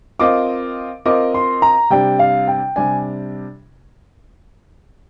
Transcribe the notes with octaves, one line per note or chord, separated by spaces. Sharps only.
C4 F4 A#4 D#5 D6
C4 F4 A#4 D#5 D6
C6
A#5
C3 G3 D4 G5
F5
G5
C3 G3 D4 G#5